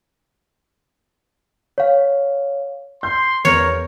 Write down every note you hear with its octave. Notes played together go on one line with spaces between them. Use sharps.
C#5 F5
C6 G6
E2 A#4 C#5